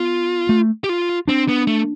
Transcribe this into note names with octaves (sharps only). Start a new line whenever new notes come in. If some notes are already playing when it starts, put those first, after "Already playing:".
Already playing: B3 F4
A3
G4
F4
C4 D4
B3
A3